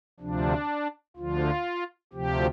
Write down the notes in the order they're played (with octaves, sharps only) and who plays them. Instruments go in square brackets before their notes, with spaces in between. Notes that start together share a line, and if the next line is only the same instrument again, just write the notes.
[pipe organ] D2 C3 F3 D4
D2 D3 F3 F4
D2 C3 F3 G4